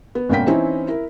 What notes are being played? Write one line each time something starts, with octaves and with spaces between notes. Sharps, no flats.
B3
G#1 B2 A#3 C#4 G5 B6
E3 C4 C#4 D#4 E4
E4 A#4